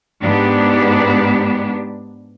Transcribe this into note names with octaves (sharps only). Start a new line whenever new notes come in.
G#2 B3 D4 G4